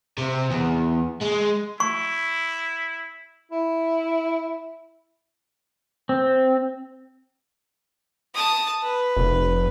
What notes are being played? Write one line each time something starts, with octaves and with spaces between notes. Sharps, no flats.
C3
E2
G#3
E4 C#6
E4
C4
A5 D#6
B4
F1